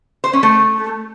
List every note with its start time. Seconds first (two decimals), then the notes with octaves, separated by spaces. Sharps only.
0.24 C5
0.33 C#4
0.43 A3